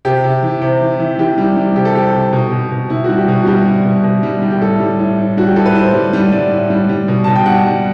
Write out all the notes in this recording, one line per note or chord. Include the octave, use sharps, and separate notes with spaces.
C3 G4
C3
E3
C3
E3
E3
E3 G4
G3
G3
C3 G4
A4
C3 G4
C3
B2
B2
B2
B2 E4
G3 F#4
G4
B2
F#4
G3 G4
G3
B2
B2
G3
G3
G4
A2 A4
G3
A2
A2
G3 F#4
G4
A2 A4
B4
A2 C5
G3
G3
G3 D5
A2
G3
G3
B2
B2 A5
G5
G3 F#5
G3